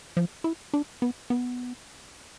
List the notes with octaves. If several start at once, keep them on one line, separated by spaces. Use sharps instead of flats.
F3
E4
D4
B3
B3